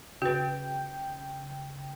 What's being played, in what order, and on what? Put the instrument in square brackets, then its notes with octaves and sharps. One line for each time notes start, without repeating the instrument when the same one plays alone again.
[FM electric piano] C#3 G5 [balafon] F#4 B4